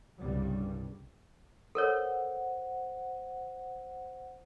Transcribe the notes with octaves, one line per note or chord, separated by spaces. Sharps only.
C2 G2 C#3 G3
A4 A#4 C5 C#5 F#5